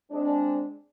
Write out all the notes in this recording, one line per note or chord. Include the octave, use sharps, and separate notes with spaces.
G#3 C4 D4